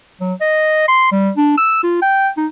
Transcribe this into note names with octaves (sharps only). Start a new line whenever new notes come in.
F#3
D#5
C6
G3
D4
E6
F4
G5
D#4